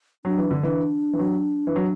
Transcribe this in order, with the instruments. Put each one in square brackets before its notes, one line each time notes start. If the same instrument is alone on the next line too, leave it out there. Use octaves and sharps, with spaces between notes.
[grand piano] F#3 [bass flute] D4
[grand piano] E3
D3
E3
E3
F#3
E3
F#3